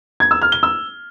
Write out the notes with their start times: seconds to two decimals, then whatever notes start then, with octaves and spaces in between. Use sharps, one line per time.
0.20 G#6
0.31 E6
0.42 F6
0.52 G7
0.63 E6